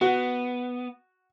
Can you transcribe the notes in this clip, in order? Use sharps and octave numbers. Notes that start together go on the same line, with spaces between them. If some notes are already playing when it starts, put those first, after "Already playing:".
B3 F#4